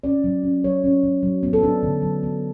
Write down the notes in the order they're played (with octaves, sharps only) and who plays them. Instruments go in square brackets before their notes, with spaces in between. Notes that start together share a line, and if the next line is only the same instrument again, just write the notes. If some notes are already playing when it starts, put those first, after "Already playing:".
[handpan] C#4 D5
F#3
C#4
F#3 C#5
C#4
F#3
F#3
B3
A4
D4
D3
F#3
B3